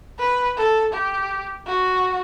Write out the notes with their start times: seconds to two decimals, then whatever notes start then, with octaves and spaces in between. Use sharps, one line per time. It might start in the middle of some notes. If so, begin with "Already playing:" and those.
0.19 B4
0.57 A4
0.93 G4
1.67 F#4